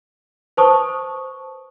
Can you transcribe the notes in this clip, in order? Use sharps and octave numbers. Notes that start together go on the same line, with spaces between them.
B4 C5 A5 C#6 D#6